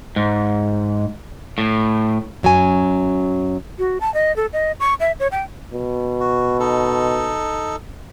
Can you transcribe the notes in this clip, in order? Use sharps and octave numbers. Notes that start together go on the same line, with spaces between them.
G#2
A2
F#2 F#3 C#4 G#5
F#4
A5
D#5
A4
D#5
C#6
E5
C#5
G5
B2
F#4
D#4 A4